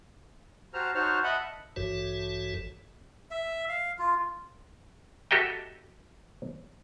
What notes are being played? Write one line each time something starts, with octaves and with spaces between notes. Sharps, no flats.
F#4 G4 C5 A5 A#5 F6
D#4 F#4 C5 C#5 A5 F6
D#5 E5 F#5 A5 B5
A1 G2 E3 F#4 A4 C#5
E5
F5
F4
F#4 G4 A4 D#5 E5 G5